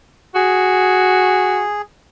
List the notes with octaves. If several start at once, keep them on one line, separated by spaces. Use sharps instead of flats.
F#4 G#4